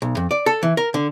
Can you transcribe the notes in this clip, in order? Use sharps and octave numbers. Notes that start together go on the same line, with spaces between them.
B1
F2
D5
A4
E3
A#4
D3